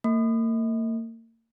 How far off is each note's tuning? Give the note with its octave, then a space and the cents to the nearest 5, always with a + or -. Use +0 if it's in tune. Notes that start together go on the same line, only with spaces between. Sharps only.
A#3 -40